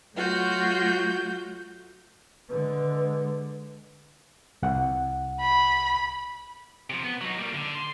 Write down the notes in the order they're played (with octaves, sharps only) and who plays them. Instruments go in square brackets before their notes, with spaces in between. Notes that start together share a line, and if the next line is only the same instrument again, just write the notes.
[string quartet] F#3 A3 F4 F#4 G6
[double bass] D3 G#3 [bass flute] B4
[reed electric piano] C2 F#5
[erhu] B5
[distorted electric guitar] C3 F3
B3
F#3 D#4
G3 A#3
D3
C6